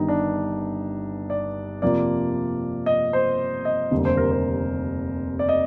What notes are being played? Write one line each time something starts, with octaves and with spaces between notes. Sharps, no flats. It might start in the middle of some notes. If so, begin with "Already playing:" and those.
Already playing: G1 G2 D#3 D#4
D4
D5
F2 C3 F3 A#3 D5
D#5
C5
D#5
F1 D#2 D3 G3 A#3
C5
A#4
C5
D5
D#5